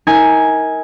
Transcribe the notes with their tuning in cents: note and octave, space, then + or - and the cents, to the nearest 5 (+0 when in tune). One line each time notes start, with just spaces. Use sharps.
D#4 +45 A#4 +0 G#5 +0